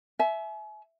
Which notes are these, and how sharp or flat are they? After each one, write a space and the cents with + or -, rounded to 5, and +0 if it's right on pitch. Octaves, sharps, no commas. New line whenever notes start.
E5 +0 G#5 +40